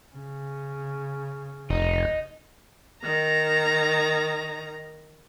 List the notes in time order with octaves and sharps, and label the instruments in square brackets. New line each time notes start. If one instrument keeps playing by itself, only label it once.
[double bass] C#3
[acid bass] F1 [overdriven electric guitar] D#4
[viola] D#3 A#5